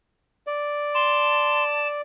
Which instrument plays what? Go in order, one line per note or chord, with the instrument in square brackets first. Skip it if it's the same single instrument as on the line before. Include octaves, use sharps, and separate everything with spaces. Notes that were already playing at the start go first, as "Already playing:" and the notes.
[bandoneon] D5
[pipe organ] A5 [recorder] C6